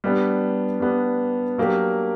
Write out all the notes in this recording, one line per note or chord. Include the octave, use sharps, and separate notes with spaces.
G3 B3 D4
G3 B3 D4
F#3 A#3 D4 G4 A#4